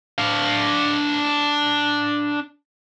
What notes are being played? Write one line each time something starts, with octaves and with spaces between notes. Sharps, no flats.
D4 F5